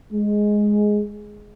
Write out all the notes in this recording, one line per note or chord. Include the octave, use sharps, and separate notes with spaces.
G#3